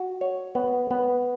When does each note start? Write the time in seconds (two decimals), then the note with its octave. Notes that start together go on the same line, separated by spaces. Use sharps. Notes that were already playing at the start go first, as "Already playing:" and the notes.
Already playing: F#4
0.21 C#5
0.55 B3
0.91 B3